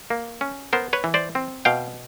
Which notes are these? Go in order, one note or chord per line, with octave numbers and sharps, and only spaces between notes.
A#3
C#4
B3 A#4 C5
B4 C#5
E3
C5 D5
C4
B2 F5 G5